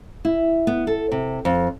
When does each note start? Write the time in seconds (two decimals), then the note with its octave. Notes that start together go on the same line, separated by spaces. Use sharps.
0.25 E4
0.67 B3
0.87 A4
1.12 C3
1.45 F2